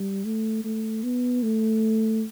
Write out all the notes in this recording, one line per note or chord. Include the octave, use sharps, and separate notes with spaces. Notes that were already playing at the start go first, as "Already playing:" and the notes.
Already playing: G3
A3
A3
B3
A3